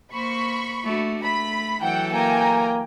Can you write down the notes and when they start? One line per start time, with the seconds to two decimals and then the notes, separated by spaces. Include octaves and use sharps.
0.13 A#3 C5 B5 C#6
0.84 A3 D4 F#4
1.23 A3 B5
1.82 E3 F#3 A4 F#5 G5
2.12 A#3 G5 G#5 A#5